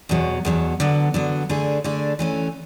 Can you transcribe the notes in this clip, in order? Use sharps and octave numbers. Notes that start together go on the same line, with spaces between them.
E2 B2 F#3
E2 B2 F#3
D3 F#3 B3
D3 F#3 B3
D3 A3 D4 G#4
D3 A3 D4 G#4
E3 A3 C#4